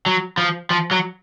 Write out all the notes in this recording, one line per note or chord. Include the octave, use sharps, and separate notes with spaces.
F#3
F3
F3
F#3